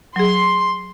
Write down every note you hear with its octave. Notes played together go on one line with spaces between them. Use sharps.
F#3 G#4 C6